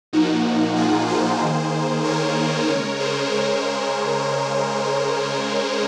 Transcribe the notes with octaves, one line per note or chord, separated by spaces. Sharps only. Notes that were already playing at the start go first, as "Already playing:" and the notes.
A#2 F3 A#3 D#4 F#4
F4 G#4
G#4 C5
D#3 A#3
A#4 C#5
C#3 G#3 A#4 C#5
G#4 C5
A#4 C#5